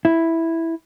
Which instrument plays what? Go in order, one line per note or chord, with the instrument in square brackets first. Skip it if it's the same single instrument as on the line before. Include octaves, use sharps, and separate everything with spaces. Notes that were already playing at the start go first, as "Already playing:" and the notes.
[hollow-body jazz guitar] E4